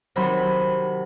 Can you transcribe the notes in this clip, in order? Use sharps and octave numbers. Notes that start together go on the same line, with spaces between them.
C3 D#3 F#3 C5 B5